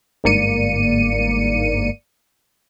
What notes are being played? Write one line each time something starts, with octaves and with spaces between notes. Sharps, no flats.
G1 G#2 A#3 D5 C#7 D#7